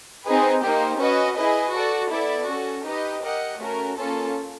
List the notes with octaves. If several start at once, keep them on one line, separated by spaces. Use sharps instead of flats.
C4 D#4 G#4 B4
A#3 D#4 G4 C5
C#4 F#4 B4 D#5
E4 G#4 B4 D#5
F#4 A4 D5
B3 E4 A4 D5
C#4 F#4 A4
D#4 G4 B4 D#5
G4 A#4 D#5 F#5
A3 C#4 F#4 A#4
A#3 C#4 F4 A4